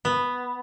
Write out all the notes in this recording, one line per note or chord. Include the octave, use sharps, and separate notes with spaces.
B3